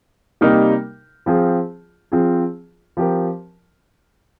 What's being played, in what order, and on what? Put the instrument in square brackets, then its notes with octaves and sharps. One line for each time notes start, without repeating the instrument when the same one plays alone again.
[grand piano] C3 G3 A#3 D#4 A#4
F3 C4 F4 G#4
F3 C4 F4 G#4
F3 C4 G4 A#4